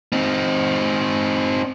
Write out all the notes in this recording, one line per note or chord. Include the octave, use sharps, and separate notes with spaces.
C4 D#4